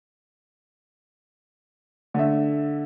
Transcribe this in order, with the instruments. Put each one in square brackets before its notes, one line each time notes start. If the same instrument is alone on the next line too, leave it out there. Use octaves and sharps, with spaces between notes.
[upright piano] D3 A3 E5